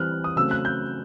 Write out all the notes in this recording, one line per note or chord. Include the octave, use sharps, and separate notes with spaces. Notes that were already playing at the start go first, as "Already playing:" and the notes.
Already playing: E3 G3 C4 F6 F#6
D#6
C#3 F#3 A3 C4 E6
F#6
G6